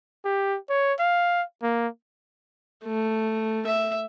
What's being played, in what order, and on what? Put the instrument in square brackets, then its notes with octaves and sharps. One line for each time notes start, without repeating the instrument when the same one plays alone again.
[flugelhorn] G4
C#5
F5
A#3
[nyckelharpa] A3
E5